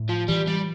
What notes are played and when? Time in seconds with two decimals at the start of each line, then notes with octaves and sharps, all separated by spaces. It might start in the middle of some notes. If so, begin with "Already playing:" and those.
Already playing: A2
0.09 F3
0.28 E3 G3
0.48 G3